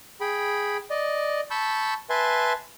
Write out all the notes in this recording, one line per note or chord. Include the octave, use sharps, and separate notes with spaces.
G#4 G5 B5
D5 D#5
A5 B5 C#6 E6 G6
B4 E5 G#5 A5 C6